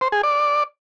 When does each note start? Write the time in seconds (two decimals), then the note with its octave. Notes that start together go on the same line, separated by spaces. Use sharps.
0.01 C5
0.12 G#4
0.23 D5